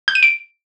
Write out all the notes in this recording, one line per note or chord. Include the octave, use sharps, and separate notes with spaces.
G6
D#7
D7